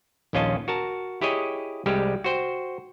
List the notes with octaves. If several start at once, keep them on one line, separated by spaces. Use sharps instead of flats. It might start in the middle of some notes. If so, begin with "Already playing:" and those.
A#1 D#2 C#4 F4 D#5 A5
F#4 A#4 A5
E4 G4 G#4 C#5 D#5
C2 G3 G#3 G4
F#4 C5 G5